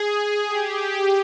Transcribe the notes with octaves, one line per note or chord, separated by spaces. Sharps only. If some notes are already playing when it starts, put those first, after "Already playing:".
Already playing: G#4
G4